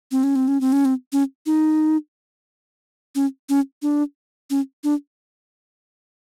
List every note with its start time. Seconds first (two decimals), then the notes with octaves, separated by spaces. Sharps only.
0.12 C4
0.23 C#4
0.36 C4
0.48 C#4
0.61 C4
0.72 C#4
0.85 C4
1.13 C#4
1.46 D#4
3.15 C#4
3.49 C#4
3.82 D4
4.50 C#4
4.84 D4